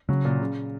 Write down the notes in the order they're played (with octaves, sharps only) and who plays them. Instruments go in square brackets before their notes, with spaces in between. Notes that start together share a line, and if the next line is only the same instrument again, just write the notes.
[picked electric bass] C#3 [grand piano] F#3
[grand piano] A#2
C#3